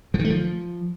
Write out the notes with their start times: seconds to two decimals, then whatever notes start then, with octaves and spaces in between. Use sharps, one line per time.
0.14 F3
0.19 D#3
0.25 A3
0.30 F3